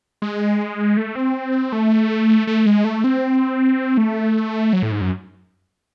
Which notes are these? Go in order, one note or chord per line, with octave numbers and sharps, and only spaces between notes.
G#3
A3
C4
A3
A3
G#3
A3
C4
A3
F#3
A2
G#2
F#2